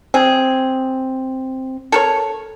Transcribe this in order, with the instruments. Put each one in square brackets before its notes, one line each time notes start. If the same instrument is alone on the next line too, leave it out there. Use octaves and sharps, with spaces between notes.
[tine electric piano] C4 [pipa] G#4
[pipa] A4 A#4 C#5